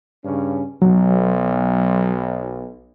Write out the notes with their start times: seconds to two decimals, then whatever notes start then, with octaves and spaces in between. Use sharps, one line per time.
0.24 G2 C#3 C#4
0.82 B1 F#3